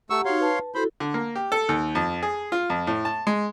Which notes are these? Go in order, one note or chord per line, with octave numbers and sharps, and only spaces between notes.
A3 G4 F#5 A#5 C#6 E6
D#4 F#4 C#5 F5 C6
B4 A5
E4 F#4 A4 C5 B5
D3
A#3
G4
A4
D#2
F2
G#4
F4
F2
A2
A5
G#3